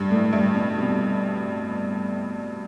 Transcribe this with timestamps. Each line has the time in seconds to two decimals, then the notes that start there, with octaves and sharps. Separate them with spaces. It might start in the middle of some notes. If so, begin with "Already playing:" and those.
Already playing: G2
0.11 A2
0.33 G2
0.54 B2
0.77 C3